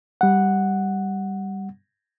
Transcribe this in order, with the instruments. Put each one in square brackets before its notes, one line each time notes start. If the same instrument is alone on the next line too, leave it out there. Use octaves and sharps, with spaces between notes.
[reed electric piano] G3 F#5